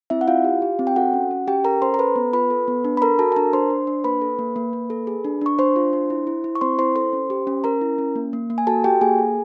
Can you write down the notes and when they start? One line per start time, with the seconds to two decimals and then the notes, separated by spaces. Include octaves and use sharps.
0.10 C4 E4 E5
0.21 F#5
0.28 E4 F4 F5
0.44 G4
0.62 G4
0.79 C4
0.87 G5
0.96 F#4 A4 F#5
1.14 C#4
1.31 C#4
1.47 C#4 G4 G5
1.64 A4 A#4 A#5
1.82 C#4 C5 C6
1.94 A#5
1.99 A4 B4 B5
2.16 B3
2.33 F4 B4 B5
2.50 A4
2.68 B3
2.85 D4
2.97 B5
3.02 A4 A#4 A#5
3.19 F#4 A4 A5
3.32 A5
3.36 D4 A#4 A#5
3.53 D4 C5 C6
3.70 D4
3.87 D4
4.04 A#3 B4 B5
4.21 A4
4.39 A#3
4.56 A#3
4.73 A#3
4.90 A4
5.07 G#4
5.25 D4
5.41 D4 C#6
5.59 D4 C5 C6
5.76 F4
5.93 D4
6.10 E4
6.27 E4
6.44 E4
6.55 C#6
6.61 C4 C5 C6
6.78 E4 C5 C6
6.95 A4 C5 C6
7.13 C#4
7.30 G4
7.47 C#4
7.64 C#4 A#4 A#5
7.81 E4
7.98 C#4
8.16 A#3
8.33 A#3
8.50 A#3
8.58 G#5
8.67 F#4 A4 A5
8.84 F#4 G4 G5
9.01 A#3 G#4 G#5
9.18 A4